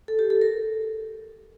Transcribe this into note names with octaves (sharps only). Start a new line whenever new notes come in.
A4
G4
A4
A#4